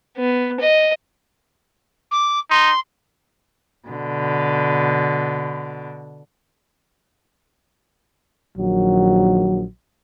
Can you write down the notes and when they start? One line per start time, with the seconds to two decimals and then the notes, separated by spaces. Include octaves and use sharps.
0.17 B3
0.60 D#5
2.11 D6
2.50 D#4 C6
3.88 B2 D3
8.58 A#1 D#3 F#3